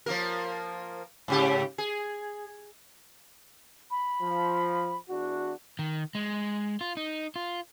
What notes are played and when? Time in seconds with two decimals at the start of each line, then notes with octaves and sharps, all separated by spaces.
0.06 F3 A#3 A#4
1.28 G#2 C#3 G4
1.78 G#4
3.91 B5
4.22 F3
5.09 E2 D4 F#4
5.79 D#3
6.15 G#3
6.81 F4
6.97 D#4
7.36 F4